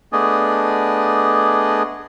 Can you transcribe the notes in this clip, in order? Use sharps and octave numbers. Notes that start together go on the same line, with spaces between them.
A3 B3 D4 G#4 D5 D#5